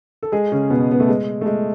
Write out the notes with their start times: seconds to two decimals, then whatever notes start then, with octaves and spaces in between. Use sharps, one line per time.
0.23 A4
0.32 G#3 G#4
0.52 C#3 C#4
0.70 B2 B3
0.91 B3
1.00 A3
1.09 G#3
1.41 A3
1.46 G#3